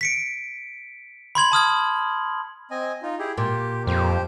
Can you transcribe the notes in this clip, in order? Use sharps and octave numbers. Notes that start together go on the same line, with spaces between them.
B6 C#7 D7
B5 C6 G#6 F#7
A5 D#6 F6 G#6
C4 D#5 G#5
D#4 F4
E4 G4 G#4
A#2 G4
F2 G4 C5